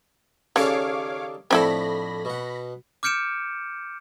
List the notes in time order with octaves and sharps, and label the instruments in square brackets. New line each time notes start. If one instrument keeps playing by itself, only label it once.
[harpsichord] D#2 A4 D5 [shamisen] C#3 [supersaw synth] C#5 F5 D6
[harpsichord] F2 A2 D4 [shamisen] C4 E4 A4 [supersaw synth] B5 A#6
[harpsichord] B2 F#5
[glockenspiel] D6 F6 G6 C#7 D7 E7